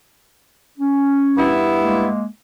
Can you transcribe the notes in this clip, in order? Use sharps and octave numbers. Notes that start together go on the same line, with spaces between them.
C#4
G2 B3 E4
G#3 A#3